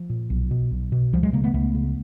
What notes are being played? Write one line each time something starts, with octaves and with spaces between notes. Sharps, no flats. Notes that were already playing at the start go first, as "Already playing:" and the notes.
Already playing: F3
A#2
B1
B2
B1
B2
C#2 F3 G3
F#3 G#3
C#3 G#3 A#3
A3 B3
C#2 A3 B3
C#3